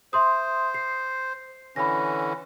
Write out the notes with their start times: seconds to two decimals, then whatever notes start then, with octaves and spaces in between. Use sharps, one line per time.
0.13 C5 E5 C6 D#6
0.74 C7
1.76 D3 E3 C#4 B5 A#6